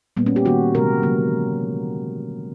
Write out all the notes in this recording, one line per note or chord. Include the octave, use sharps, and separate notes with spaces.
A#2 G3 A#3 B3
C#4
G4
D#3 G3 A#3 F#4
C3 E3 G#3 A#4
D3 F#3 A#3